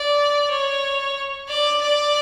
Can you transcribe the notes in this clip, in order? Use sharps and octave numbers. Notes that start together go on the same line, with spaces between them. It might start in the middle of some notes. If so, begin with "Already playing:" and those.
Already playing: D5
C#5
D5
D5